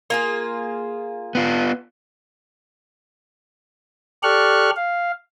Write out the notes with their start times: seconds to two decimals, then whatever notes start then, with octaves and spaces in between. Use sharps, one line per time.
0.10 A#3 F4 G#4
1.35 B3 F4
4.23 G4 A4 D5 C#6 F6 F#6
4.76 F5